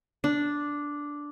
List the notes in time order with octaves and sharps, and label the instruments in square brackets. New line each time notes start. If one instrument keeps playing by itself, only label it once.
[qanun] D4